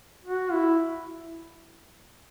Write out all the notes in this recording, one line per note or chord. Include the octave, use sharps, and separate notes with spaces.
F#4
E4